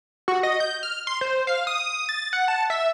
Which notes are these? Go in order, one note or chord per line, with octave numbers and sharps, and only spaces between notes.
F#4
D#5
G6
F6
C6
C5
F5
D#6
A6
F#5
A5
E5